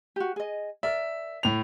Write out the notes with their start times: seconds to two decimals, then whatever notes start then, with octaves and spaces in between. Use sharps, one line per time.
0.16 F#4 G4
0.36 G#4 D#5
0.83 A#4 D5 E5
1.43 A2 F7